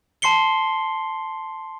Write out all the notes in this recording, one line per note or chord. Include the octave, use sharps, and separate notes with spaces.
A5 C6 C7 C#7 G7